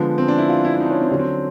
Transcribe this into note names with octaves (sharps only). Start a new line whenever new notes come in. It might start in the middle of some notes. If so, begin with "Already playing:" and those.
Already playing: D3 F3 G#3 B3
C4
D4
E4
F4
E4
E4
D#4
D4
C#4
C4
D3 F#3 C#4
C4